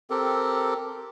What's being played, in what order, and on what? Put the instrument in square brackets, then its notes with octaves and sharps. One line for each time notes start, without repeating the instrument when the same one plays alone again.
[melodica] C4 G4 A4 A#4